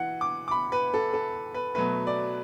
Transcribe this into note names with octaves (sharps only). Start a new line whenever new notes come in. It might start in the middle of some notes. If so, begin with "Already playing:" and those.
Already playing: E3 F#5
D6
D6
B5
B4
A4
A4
B4
B2 F#3 A3 B4
D5